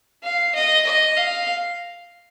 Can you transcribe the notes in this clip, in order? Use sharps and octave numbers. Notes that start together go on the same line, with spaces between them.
F5
D#5
D#5
F5